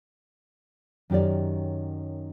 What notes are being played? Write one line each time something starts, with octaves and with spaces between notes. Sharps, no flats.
F#2 D#3 G4 C#5 D5